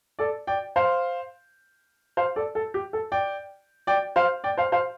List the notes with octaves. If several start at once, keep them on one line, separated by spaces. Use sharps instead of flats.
A4 D5
D5 G5
C5 F5
C5 F5
A4 D5
A4
G4
A4
D5 G5
D5 G5
C5 F5
D5 G5
C5 F5
C5 F5